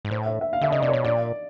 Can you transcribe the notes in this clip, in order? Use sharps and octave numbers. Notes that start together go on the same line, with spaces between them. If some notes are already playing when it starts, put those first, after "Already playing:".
G#2
A2 C5
E5
E5
F5
D3 E5
C#3 D#5
C3 D5
C#5
B2
A#2 D5